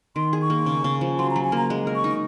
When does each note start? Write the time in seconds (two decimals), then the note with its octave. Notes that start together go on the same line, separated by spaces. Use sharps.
0.16 D#3 C6
0.33 G#4
0.42 C#6
0.50 A#3
0.66 C#3
0.84 C#3
1.01 F3
1.18 F#3 C6
1.31 A#5
1.36 F#3
1.44 G#5
1.52 A#3
1.57 A#5
1.70 G#3
1.87 A#4
1.95 C#6
2.04 D#4